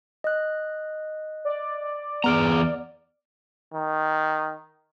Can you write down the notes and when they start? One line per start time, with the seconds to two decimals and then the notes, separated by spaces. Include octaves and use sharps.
0.24 D#5 F#6
1.45 D5
2.24 E2 B3 G#4 A#5 F6 D7
3.74 D#3